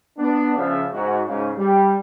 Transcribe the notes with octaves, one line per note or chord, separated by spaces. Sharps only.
B3 D4
C#3 F3 E5
G#2 F#4
G#2 C#3
G3